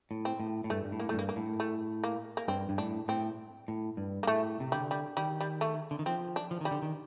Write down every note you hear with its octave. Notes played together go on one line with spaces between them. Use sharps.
A2
C4
A2
A2
G2 A3
G2
A2
A#3
A2 A3
G2 A#3
A#3
A2
A3
A#3
A#3
G2 C4
G2
A2 D4
A2 C4
A2
G2
A#3
A2 A3
C3
D3 G3
G3
D#3 G3
G3
A3
D3
D#3
F3 C4
D4
F3
D#3 G3
D3
D#3